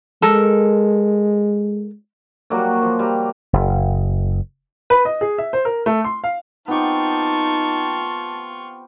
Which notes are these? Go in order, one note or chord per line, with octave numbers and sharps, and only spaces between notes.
G#3 A4 A#4
F#3 G3 A#3 F#4
F3
G3 A#5
F#1
B4
D#5
G#4
E5
C5
A#4
A3
C6
F5
B3 C4 D#4 F4 G4 A5 C#6